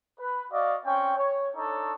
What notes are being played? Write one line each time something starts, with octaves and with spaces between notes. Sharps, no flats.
B4
F#4 D5 D#5 F5
C4 C#4 G5 C#6
C#5
D4 D#4 A4 C#5